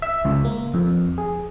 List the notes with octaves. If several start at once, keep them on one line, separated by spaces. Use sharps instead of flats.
E5
C#2
A#3
F2
G#4